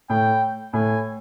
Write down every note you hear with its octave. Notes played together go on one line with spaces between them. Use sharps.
A2 G5
A2 G#5